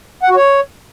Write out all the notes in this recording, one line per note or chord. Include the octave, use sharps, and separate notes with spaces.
F#5
F#4
C#5